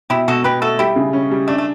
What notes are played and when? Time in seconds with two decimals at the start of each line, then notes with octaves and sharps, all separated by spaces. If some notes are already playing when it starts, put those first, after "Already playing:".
0.10 B2 E4 G4
0.28 B2 F#4 A4
0.44 B2 G4 B4
0.61 A3 F#4 A4
0.79 G3 E4 G4
0.96 C#3
1.13 C#4
1.31 G3
1.48 A3 D4
1.58 A3